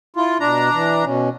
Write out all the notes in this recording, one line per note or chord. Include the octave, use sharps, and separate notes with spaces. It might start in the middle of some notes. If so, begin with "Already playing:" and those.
E4 F4
B2 D4 A#5
E3
B2 C#4